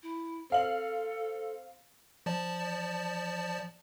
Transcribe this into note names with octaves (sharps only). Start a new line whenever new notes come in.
E4
C4 A4 F5 F#7
F3 D5 A5